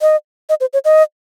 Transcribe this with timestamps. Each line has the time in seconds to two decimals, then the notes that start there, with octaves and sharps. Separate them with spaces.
0.02 D#5
0.49 D#5
0.61 C5
0.73 C#5
0.85 D#5